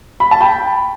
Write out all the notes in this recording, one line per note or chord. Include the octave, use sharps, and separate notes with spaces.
B5
A5
G5 B5